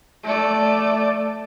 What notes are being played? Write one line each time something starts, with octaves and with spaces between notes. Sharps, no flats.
A3 D5